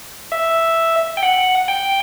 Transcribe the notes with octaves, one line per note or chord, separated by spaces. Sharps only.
E5
G5
F#5
G5